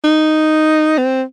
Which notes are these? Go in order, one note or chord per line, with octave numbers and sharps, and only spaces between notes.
D#4
C4